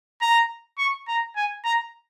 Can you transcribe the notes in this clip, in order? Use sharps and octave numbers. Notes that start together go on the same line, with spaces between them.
A#5
C#6
A#5
G#5
A#5